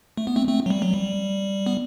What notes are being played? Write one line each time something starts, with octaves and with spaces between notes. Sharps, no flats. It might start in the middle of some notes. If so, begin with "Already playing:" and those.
A3
B3
A3 C4
A3 C4
F#3
G3
F#3
G3
B3